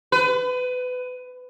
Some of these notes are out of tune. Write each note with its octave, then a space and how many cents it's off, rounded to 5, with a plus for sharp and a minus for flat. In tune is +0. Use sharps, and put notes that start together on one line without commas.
B4 +25